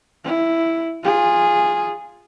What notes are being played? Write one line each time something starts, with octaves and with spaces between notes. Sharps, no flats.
E4
F4 G#4